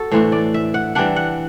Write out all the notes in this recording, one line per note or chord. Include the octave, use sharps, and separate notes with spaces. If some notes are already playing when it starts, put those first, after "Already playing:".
Already playing: F#4 A4
A2 E3 A3 D4 C5
D5
E5
F#5
E3 G3 D4 F#5
F#5